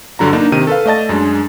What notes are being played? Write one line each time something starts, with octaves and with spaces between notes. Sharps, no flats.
G2 D3 F#3 A#5
A#3 D4 D#4 D5
C3 D#3 D#7
A4 B4 F5
A3 D5 D#5 A5 A6
F#2 G#3 D4